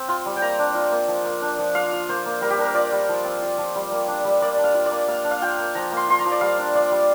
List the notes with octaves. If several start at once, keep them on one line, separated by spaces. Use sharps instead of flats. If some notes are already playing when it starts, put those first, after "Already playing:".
Already playing: C4
F4 C6
G3
G5
A#3 A#5
D4
F4
A#3
F3
A#3
D4
F3
F4 F5
F4
A#3 C5
A#3
G3 A#4
G4
D4 A#4
F4 D5
G3
F3
C4
F4
F3
G3
A#3
D4
G3
A#3 D5
D4
F5
F4
D5
A#3
A#3 F5
D4
F5
F4 G5
A#3
F3 A#5
A#3
C6
F4 C6
A#5
F3
D5
G3 F5
D4
F4 D5
G3